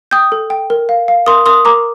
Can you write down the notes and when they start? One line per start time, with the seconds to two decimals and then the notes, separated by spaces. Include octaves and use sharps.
0.11 G5 D#6 G6
0.32 A4
0.50 G5
0.70 A#4
0.89 F5
1.08 F5
1.26 A#4 C6 D#6
1.46 A#4 C6 D#6
1.65 A#4 A#5 D6